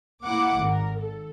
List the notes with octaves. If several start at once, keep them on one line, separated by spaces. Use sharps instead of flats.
A#3 E4 F#5 D6
G#1 A#4
A4